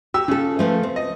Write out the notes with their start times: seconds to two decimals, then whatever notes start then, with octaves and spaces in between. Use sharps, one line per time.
0.14 F#4 G4 E6
0.28 C#3 F4 A4
0.59 F3 A3 B4
0.83 C4
0.96 D#5